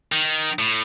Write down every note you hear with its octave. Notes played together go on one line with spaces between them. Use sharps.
D#3
A2